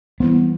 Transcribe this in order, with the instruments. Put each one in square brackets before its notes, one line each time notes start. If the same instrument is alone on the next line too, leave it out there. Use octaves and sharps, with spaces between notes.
[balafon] E3 G3 E4 [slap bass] B3